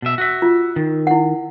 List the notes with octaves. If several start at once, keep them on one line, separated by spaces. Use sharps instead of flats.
B2 E5
F#4 E5
F4
D#3
E4 F#5